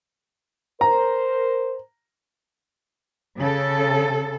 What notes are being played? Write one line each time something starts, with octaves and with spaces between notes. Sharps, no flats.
A#4 C5 A#5
C#3 A4